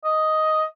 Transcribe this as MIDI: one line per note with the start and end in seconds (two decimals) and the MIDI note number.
0.04 0.64 75